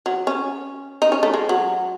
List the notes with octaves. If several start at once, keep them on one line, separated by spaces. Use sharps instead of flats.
F#3
C#4
D#4
C#4
A3
G#3
F#3